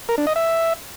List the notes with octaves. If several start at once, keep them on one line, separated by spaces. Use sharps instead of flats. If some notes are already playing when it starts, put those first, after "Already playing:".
A#4
D4
D#5
E5